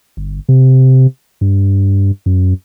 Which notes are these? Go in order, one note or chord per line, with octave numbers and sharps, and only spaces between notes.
G1
C3
G2
F#2